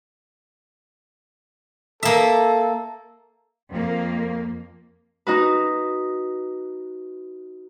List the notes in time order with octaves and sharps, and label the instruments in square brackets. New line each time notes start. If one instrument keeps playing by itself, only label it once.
[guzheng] A#3 E5 [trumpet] A4
[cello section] F2 A#3
[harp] D#4 F#4 B4